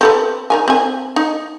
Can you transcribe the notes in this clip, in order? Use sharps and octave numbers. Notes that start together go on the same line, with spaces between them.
C4 A4 B4
D#3 A#4 G#5
C4 G#5
D#4